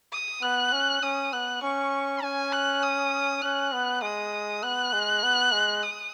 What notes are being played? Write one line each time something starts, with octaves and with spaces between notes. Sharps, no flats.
D#6
B3 F#6
C#4
C#4 D#6
B3 F#6
C#4 C#6
C#4 G#5
F#6
D#6
C#4 F#6
B3
G#3 D#6
B3 F#6
G#3
B3
G#3
D#6